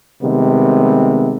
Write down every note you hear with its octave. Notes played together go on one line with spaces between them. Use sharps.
C3 D#3 G3 G#3 B3